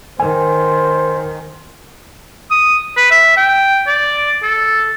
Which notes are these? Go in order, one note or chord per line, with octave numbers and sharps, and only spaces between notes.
D#3 C5 G#5
D#6
B4
E5
G5
D5
A4